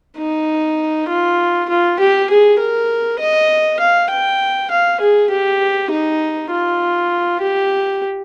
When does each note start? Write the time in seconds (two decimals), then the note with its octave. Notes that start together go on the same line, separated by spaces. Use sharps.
0.18 D#4
1.08 F4
1.69 F4
1.99 G4
2.30 G#4
2.59 A#4
3.19 D#5
3.79 F5
4.10 G5
4.71 F5
5.00 G#4
5.30 G4
5.91 D#4
6.51 F4
7.41 G4